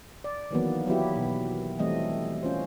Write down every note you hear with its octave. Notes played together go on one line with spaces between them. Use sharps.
D5
D#3 E3 F#3 A#3 B3
F#3 B3 E4 G4
B2
E3 G3 A3 C4 D#5
C#4 F4 C5